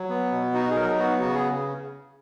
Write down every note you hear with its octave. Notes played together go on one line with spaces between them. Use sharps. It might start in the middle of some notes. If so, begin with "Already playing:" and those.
Already playing: F#3
B3
B2
D#4 F#4
G#4
F#3 A#4
B3 F#4
C#3 F#4
G#4